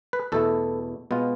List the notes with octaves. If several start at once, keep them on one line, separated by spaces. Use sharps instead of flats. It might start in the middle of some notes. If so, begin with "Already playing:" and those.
B4
E2 B2 A3 E4 A4
B2 G#3 B3 F4